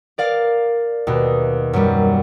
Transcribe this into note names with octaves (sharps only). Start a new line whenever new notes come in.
A#4 D5 F5
D#2 B2
F#2 G3